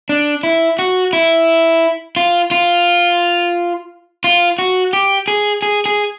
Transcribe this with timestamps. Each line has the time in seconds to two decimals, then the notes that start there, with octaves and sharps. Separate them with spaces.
0.09 D4
0.43 E4
0.79 F#4
1.13 E4
2.16 F4
2.51 F4
4.24 F4
4.59 F#4
4.93 G4
5.28 G#4
5.62 G#4
5.86 G#4